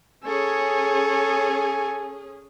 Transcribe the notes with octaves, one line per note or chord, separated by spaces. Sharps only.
C#4 G#4 A4 C#5 G#5